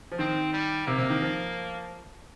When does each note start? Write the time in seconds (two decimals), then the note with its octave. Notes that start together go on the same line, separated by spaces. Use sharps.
0.12 F3
0.19 D#3 C4
0.53 G3
0.87 C3 A#3
0.98 C3
1.10 D#3
1.22 F3